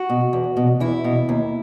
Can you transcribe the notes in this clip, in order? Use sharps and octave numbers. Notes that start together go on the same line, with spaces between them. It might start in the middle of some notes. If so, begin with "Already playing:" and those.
Already playing: F#4
B2
E2
B2
E2 E4
B2
D#2